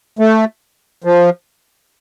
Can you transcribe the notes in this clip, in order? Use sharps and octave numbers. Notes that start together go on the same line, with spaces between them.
A3
F3